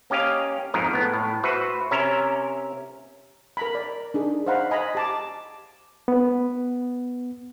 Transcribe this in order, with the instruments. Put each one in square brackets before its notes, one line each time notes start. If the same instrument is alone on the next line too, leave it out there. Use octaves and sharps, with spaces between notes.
[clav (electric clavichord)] A#3 C#4 G4 D#5 F5
F2 G#2 A#4 D#5
A2 B3
A2
F#4 B4 C5 E5
C3 C#4 A#4 E5
[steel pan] A#4 A#5 B5
D5
D4 D#4 G#4
C5 D#5 F5 F#5 A#5 B5
D#5 G#5 A#5 B5
G4 A5 D6
[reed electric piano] B3